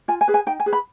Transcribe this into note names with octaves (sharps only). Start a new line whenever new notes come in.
F4 G#5
G#5
G#4 B4
G#5
D#4 G5
G#5
G#4 B4
B5